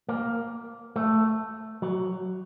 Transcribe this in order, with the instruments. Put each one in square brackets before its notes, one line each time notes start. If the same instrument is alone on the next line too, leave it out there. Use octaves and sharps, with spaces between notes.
[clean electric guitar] A#3
A3
F#3